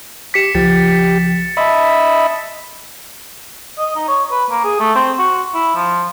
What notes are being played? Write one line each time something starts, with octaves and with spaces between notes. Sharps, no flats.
G4 D6 B6 C#7 E7
C#2 F3 G4 A6 B6
D#5 E5 A5 B5 C6
D#5
D#4
C#5
B4
A#3
G#4
A3
C4
F#4
E4
F3